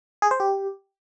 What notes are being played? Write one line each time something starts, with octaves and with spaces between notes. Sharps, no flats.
G#4
C5
G4